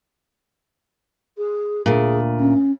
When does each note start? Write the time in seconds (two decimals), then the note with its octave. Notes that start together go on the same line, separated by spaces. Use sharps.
1.37 G#4
1.86 D2 A#2 G#4
2.39 C#4